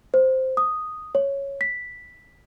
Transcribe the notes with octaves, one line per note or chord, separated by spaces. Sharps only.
C5
D#6
C#5
B6